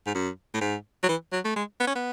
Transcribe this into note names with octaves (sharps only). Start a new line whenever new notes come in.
G#2
F#2
A2
G#2
F#3
E3
F#3
A3
G#3
B3
C#4
B3